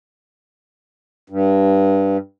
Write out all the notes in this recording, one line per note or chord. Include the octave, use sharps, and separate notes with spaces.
G2